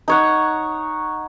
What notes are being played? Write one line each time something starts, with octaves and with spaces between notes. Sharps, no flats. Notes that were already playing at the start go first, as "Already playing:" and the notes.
D#4 C#5 F#5